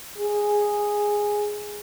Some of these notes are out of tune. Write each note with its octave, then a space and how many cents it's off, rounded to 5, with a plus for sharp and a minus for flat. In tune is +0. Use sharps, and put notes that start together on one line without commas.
G#4 -5